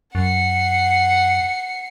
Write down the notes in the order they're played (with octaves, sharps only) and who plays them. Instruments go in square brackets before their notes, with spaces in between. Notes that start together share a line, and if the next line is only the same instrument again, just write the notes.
[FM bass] F#2 [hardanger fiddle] F#5 [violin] C7 C#7